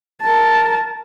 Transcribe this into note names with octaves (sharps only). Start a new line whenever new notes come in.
A#4 A5